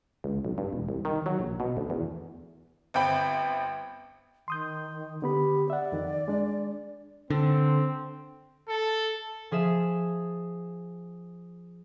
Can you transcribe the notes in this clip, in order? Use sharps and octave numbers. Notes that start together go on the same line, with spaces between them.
C#2
B1
G2
E1
C2
D#3
F#3
A#1
B2
D2
E2
G1 C4 G5 B5
D#3 C6 D#6 G6
D3 B3 G4 B5
D5 E5 F#5
F2 D#3
G#3 D4
D3 C4
A4
F3 G#4 E5 E7